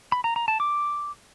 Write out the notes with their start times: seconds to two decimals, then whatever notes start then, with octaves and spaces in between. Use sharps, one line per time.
0.12 B5
0.24 A#5
0.36 A#5
0.48 A5
0.60 D6